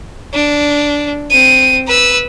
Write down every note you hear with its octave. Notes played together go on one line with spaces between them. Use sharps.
D4
C4 D#7
B4 E6